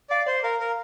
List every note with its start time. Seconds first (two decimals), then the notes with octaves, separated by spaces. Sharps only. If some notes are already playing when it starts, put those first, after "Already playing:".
0.10 D5 F5
0.27 C5 D5
0.44 A#4 F5
0.60 A#4